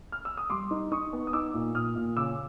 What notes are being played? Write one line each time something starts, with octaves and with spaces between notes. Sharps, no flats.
F6
E6
D#6
G3 C6 D6
D#4
D#4 C#6 D#6
B3
D#6
D#4 D6 E6
A#2
A#2 D#6 F6
A#2
C#3 D6 E6